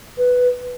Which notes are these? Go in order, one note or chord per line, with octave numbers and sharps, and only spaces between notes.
B4